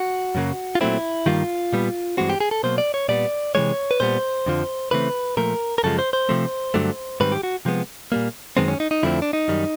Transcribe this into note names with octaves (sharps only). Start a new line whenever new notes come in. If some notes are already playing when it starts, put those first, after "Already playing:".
Already playing: F#4
F#2 C#3 F#3 A#3
F4
A#2 F#3 A3 C4 E4
G2 D#3 G3 A#3 F4
A#2 G3 B3
G2 E3 G#3 C4 F#4
G4
G#4
A4
B2 F#3 A#3 C5
D5
C#5
A#2 G3 B3 D5
C3 E3 G#3 C#5
B4
A#2 G3 B3 C5
F2 D3 F3
C#3 E3 A3 C4 B4
A#2 F3 A3 A#4
A#4
F#2 C#3 F3 G#3 A4
C5
C5
C3 F3 A3 C4
G2 D3 F#3 A3
G#2 D#3 G3 C4 B4
G4
F#4
C3 F3 G#3 B3
A#2 G3 A#3
F#2 D#3 G#3 B3 C4
C#4
D#4
D#4
F2 D3 F3 A3 C4 E4
D4
D#4
F#2 D#3 G3